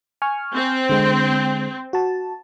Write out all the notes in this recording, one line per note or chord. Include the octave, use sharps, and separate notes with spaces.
G#5 C#6 F6
C4
D3 G#3 G5
F#4 A5